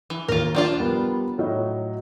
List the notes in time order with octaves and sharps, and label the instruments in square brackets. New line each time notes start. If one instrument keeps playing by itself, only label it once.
[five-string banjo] E3
[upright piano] D#2 [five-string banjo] F4 A#4
[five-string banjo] F3 D4 F4
[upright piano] G3 B3 A#4
A2 F#3 D#4